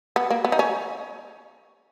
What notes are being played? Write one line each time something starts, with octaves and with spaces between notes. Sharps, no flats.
B3
A#3
B3
D#4
C#4